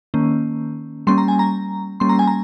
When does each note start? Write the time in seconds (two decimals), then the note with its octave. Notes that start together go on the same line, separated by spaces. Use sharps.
0.14 D#3 A#3 C#4
1.07 G3 A#3 C#4 C6
1.18 A#5
1.28 G#5
1.39 A#5
2.00 G3 A#3 C#4 C6
2.09 A#5
2.19 G#5
2.27 A#5